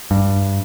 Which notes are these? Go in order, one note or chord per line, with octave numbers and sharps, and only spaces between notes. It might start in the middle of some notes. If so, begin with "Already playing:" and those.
G2